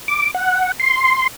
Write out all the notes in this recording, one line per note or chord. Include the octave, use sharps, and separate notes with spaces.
D6
F#5
C6